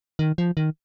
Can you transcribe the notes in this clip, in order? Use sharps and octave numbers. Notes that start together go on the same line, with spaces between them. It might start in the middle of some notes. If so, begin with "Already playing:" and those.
D#3
F3
D#3